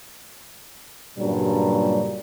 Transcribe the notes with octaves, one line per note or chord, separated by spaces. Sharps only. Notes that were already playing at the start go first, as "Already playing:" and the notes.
G2 A#2 C#3 F#3 G3